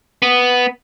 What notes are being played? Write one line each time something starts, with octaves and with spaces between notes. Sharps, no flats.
B3